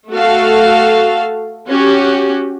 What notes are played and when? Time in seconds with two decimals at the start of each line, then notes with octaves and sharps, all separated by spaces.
0.10 A3 F#4 A4 F5
1.67 C#4 F#4 G4